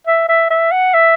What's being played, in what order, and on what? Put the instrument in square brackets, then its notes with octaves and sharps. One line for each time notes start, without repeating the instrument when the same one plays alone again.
[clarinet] E5
E5
E5
F#5
E5